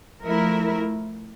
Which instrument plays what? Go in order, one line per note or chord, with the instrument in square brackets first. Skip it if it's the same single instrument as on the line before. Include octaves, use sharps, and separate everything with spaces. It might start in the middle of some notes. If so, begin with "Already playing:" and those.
[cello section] F3 A3 E4 A#4